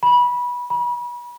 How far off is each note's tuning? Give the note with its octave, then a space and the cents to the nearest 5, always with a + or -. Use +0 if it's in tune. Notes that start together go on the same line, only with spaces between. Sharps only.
B5 -20
B5 -35